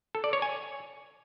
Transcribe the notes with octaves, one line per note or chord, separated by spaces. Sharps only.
A4
D5
C#5
G#5